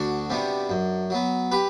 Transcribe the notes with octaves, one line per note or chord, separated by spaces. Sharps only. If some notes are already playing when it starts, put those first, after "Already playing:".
Already playing: D2 D4 F#4
C3 G3 B3
F#2
F#3 B3
G4 B4